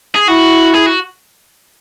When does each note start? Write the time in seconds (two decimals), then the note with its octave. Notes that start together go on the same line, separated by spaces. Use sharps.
0.16 G#4
0.28 E4 F#4
0.74 G#4
0.86 F#4